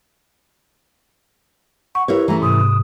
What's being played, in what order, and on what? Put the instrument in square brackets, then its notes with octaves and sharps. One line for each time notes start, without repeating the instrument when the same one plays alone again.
[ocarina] F#5 [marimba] C#6
[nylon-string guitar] E4 A#4 C#5 [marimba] G4 [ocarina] B4
[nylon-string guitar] E3 A3 C#4 [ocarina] A#5
[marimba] G#2 C3 [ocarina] D#6